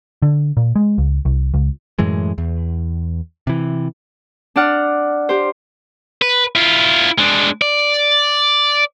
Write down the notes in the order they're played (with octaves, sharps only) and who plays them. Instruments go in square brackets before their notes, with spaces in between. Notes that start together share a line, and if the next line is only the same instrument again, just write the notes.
[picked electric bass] D3
A#2
G#3
C#2
C2
C#2
F#2 A2 E3 G#3
E2
C3 E3
[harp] D4 D5 F#5 F6
G4 C5
[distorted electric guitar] B4
E4 F4
G#3 D4
D5